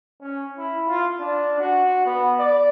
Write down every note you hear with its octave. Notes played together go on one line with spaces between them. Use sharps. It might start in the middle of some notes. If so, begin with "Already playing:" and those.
C#4
E4
F4
D4
F#4
B3
D5